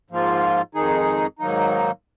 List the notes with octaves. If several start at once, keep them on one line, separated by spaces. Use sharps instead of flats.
G#2 F3 A#3 F4
F2 D#3 G#3 D#4 G#4
G#2 D#3 F#3 A#3 D#4